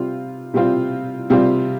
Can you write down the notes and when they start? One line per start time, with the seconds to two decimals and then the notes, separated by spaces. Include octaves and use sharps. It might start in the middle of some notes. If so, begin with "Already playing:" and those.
Already playing: C3 G3 C4 F4
0.54 C3 G3 C4 F4
1.30 C3 G3 C4 F4